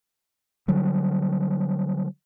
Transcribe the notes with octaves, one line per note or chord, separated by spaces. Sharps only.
D3 F#3 G3